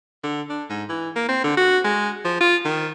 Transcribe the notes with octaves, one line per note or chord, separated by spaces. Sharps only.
D3
D4
G#2
E3
A#3
C4
D3
F#4
G#3
F3
F4
D#3